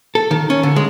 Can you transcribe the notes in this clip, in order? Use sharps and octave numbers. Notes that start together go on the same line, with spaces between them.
A4
D#3
C#4
D3
G#3